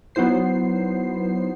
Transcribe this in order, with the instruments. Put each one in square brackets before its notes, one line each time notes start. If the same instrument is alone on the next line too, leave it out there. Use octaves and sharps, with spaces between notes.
[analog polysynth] F#3 B3 D#4 E4 C5 C7